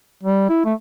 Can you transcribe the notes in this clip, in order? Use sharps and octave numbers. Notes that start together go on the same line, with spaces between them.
G3
E4
A3